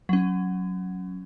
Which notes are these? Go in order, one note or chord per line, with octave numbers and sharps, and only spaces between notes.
F#3 C#4